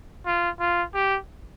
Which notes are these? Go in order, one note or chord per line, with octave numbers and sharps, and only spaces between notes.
F4
F4
G4